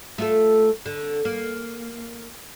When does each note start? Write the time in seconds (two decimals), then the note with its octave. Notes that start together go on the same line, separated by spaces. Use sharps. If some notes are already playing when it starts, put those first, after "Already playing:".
0.18 A3 F4 A4
0.86 D3
1.25 A#3